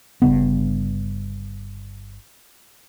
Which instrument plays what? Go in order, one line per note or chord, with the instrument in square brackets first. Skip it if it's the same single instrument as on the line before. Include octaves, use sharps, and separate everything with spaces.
[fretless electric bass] G1 G2 C#3 B3